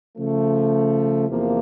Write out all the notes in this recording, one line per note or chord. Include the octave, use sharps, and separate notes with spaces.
C#3 F3 A3
E2 C3 F3 A#3